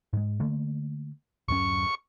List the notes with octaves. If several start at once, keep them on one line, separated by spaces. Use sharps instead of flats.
G#2 G#3
D3 A3 A#3
D1 F#2 C#4 C#6